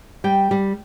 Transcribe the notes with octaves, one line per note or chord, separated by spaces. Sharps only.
G3 G5
G3